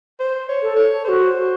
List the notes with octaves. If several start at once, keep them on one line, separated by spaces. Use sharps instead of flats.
C5
C#5
A4
C#5
F#4 A4 C5